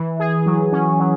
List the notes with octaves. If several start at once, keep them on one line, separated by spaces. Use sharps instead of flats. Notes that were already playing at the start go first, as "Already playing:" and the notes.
Already playing: E3
G#4
F#3
C#4
F#3